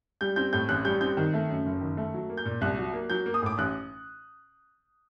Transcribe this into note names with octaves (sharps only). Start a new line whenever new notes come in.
G3 G6
C4 G6
A2 G6
A1 F#6
G3 G6
C4 G6
D#3
A3
F#2
F#1
D#3
A3
F#3
A#3
G6
A#2
C2 F#6
F#3
A#3
F#3 G6
A#3
D#6
A2 D6
A1 F#6